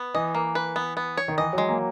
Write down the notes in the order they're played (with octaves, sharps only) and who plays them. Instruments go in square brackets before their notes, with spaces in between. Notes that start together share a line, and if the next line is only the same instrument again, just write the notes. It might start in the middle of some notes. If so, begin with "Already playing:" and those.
Already playing: [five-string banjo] B3
[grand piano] E3 [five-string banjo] D#5
[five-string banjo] A#3
B4
B3
B3
C#5
[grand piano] D#3
[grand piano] E3 [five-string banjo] D#5
[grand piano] F#3
[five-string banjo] G#3
[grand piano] A#3